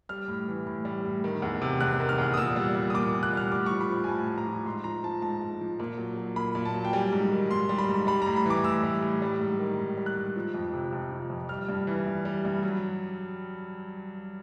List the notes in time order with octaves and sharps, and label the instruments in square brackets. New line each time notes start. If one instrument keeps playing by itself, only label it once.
[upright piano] G3 F6
A2
E3
A2
G3
A2
D#3
E2
C3
E2 F#6
D#3
F6
E2
D#6
A#2 E6
G3
G3
D#6
A#2 D6
A#2
F#6
G3 F6
A2 D6
F3 C#6
B5
F3
G#5
A2 A5
A2
A#5
F3
G#2 C6
F3 A#5
F3 A5
G#2 A5
G#2
F3
A#2
F#3
F#3
A#2 B5
A#2
A5
F#3
G5
G3 G#5
G#2
D#3
G#2 C6
G3
B5
G#2
G3 B5
A2 A#5
B5
E3 D6
A2 E6
G3
A2
G3
G#2
D#3
G#2
G3
F#6
G#2
F3
F2
C3
F2
F3
F2
G3 F6
G2
E3
G2
G3
G2
F#3